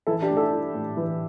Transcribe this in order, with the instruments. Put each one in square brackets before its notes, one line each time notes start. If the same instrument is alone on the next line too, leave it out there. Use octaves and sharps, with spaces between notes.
[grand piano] E3 [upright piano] E4 A4
[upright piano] D4 G4
[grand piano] A3
[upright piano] E4 A4
[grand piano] E4
A2
E3